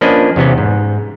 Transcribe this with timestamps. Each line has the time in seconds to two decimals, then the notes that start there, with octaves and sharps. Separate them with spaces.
0.01 F3 A#3 C#4 D4 B4 D#5
0.36 E2 C3 B3 C#4
0.58 G#2